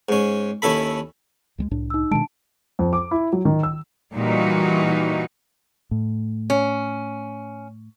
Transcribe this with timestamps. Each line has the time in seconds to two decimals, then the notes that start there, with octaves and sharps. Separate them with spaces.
0.09 G#2 C#4
0.62 D#2 C#4 E4 A4 B5
1.58 C#2 G3 G#3
1.71 C2 A2 D4
1.90 D#4 E6
2.11 B2 D#3 G#3 D4 A5 D7
2.79 F2
2.93 D6
3.11 E4
3.33 F#3
3.45 D#3
3.63 E6
4.15 A#2 E3 G3 D#4 F#4
5.91 A2
6.50 C#4